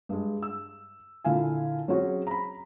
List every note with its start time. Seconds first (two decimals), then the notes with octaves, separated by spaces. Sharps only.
0.09 G2 G#3
0.43 E6
1.25 A#2 D3 E4 F5 G#5
1.88 F#3 C4 C#4 F#4 G#4
2.27 A#5 B5